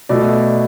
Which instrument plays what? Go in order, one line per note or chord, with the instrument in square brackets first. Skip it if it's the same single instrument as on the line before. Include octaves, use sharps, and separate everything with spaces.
[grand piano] B2 A3 D5